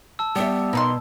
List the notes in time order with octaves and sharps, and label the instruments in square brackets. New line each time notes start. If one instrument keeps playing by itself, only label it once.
[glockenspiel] A5 E6
[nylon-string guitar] G3 E5 [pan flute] B3
[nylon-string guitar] B2 [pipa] A#3 D#4 C6